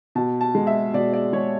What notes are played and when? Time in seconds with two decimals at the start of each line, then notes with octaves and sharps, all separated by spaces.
0.15 B2 A5
0.41 A5
0.55 G#3
0.67 E5
0.94 B2 D5
1.13 D5
1.33 G#3 C#5